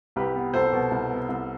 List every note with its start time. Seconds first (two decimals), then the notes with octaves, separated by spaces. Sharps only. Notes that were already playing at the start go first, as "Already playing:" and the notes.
0.16 C2 G4 B4
0.36 B3
0.54 C2 A4 C5
0.73 B2
0.91 C2
1.11 B3
1.28 C2